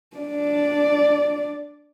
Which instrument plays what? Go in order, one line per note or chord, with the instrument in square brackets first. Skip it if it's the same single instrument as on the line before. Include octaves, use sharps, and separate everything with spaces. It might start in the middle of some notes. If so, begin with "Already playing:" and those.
[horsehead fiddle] D4 D5